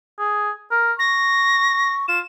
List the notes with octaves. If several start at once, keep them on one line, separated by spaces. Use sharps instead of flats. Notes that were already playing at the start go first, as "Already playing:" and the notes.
G#4
A#4
C#6 A#6
F4 E7